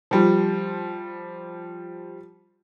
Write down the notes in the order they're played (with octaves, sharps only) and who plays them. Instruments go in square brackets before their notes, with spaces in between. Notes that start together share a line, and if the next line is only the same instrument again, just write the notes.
[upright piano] F3 G3